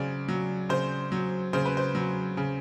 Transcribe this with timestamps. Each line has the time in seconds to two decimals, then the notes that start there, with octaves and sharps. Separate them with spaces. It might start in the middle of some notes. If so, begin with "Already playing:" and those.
Already playing: C#3 F#3 C5 D5
0.28 F#3
0.69 C#3 C5
1.12 F#3
1.53 C#3 C5
1.65 B4
1.77 C5
1.95 F#3
2.37 C#3